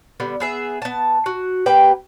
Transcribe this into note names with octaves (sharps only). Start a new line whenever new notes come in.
D3 G3 B3
B3 G#4 E5
B3 A5
F#4
A#3 G4 B4 G5